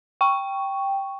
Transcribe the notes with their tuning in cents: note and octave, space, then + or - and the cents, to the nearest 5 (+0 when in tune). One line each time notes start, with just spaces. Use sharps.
G5 +0 C#6 +0